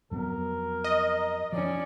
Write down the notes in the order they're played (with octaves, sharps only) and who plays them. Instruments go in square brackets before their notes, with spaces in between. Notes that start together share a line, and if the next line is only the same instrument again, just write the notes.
[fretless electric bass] F2 F#3 B3 [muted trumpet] A#4
[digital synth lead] D#5
[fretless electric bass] F3 [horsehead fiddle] C#4 D5